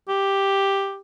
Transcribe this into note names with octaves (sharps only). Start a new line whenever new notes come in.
G4